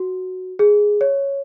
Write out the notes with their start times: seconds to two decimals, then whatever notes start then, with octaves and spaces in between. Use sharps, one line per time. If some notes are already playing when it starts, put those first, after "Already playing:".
Already playing: F#4
0.59 G#4
1.01 C#5